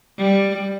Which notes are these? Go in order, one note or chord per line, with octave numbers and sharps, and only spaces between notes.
G3